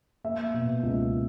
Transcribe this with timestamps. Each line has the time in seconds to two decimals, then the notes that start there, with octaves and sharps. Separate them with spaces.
0.24 A#3 E5
0.54 B2
0.83 C#2